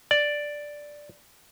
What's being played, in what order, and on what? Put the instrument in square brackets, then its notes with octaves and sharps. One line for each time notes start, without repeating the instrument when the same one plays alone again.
[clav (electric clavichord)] D5